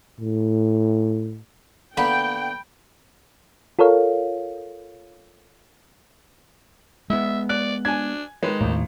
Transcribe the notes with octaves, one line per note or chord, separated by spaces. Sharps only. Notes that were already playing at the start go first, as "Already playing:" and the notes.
A2
D3 A#3 B3 G5 B5
F4 A4 A#4 C#5 F5
G#3 B3 E5
D5 F#6
D4 G#5 G#6
D#3 G#3 B4
G#1 D#2 A2